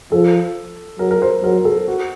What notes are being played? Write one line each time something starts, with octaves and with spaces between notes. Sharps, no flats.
F3 A4
F#3 A#4
A#4
C5
F#3 A#4
A4
F#4